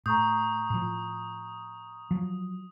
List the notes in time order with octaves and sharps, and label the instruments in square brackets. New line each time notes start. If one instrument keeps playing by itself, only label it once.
[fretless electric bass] A2 [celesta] A#5 C#6 G6 [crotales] D#6
[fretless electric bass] A2 F3
F3 F#3